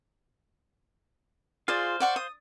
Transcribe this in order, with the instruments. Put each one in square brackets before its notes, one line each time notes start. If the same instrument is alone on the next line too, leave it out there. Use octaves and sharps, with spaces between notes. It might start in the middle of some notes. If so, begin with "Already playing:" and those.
[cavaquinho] F4 G#4 D5 [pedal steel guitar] C5 F5
[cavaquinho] D5 F#5 C#6
D#6